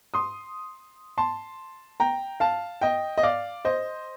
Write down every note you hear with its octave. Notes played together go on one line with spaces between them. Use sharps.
C6 D#6
A5 C6
G5 A#5
F5 A5
D#5 G5
D#5
D5 F5
C5 D#5